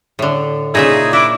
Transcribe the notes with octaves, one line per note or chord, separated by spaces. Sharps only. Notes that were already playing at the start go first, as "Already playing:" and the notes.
A2 D3
A#2 C#3 D#4 E4 G#4 E5
D4 E4 D6